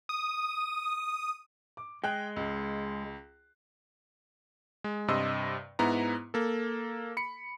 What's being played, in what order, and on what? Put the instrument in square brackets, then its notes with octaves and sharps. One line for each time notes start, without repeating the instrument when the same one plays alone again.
[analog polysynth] D#6
[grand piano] D6
[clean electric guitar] G#3 [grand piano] G5 F#6
[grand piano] C#2
[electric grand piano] G#3
G2 C3 D#5 C6 E6
G#2 B3 E4 A#5
A#3 A4
B5 C#7